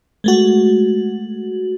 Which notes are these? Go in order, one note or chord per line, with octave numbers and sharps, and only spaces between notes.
G#3 A3 F#4